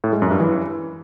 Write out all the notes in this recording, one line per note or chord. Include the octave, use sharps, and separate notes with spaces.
A2
G#3
F#2
G2
E3